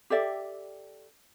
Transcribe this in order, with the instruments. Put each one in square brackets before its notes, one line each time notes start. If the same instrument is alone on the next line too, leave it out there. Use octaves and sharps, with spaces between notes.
[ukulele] G4 A4 D5 E5